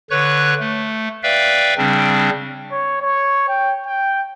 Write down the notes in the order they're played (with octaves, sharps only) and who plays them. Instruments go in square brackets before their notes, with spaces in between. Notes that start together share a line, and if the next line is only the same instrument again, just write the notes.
[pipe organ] D3 B4 C#5 C#6 F#6
A3
B4 D5 E5 F5 G5
C#3 G3 C4 D4
[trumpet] C#5
C#5
G5
G5